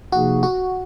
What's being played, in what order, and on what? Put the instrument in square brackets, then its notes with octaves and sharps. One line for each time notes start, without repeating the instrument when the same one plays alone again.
[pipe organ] C3 F3 A#3 D#4 G#4 [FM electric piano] F#4
[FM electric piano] F#4